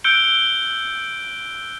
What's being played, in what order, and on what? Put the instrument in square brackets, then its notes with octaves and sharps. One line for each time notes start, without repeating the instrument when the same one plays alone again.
[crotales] E6 F#6 G6 C#7 D7 G7